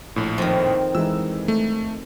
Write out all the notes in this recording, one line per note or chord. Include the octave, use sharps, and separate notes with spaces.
A#1 A2
F2 D#3
E3 G#3 D#4 E6
A3